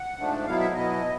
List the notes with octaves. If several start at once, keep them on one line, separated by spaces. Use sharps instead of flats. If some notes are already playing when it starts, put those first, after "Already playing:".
Already playing: F#5
G#2 F3 A3 D4
B2 F#3 B3 E4 F5
E5
B2 F#3 B3 E4 D#5